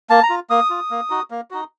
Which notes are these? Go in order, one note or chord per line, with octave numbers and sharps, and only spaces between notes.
A#3 A5
A#5
F4
A#3 D#6
F4
A#3
D#4 F#4
A#3
D#4 F#4